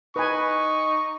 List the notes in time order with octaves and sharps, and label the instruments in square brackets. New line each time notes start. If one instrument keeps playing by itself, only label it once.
[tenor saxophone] D#4 [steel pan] B4 G#5 [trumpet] C#6